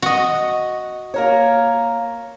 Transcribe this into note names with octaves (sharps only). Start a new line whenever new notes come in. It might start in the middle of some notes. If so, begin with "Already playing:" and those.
F#4 D#5
A#3 A#4 C#5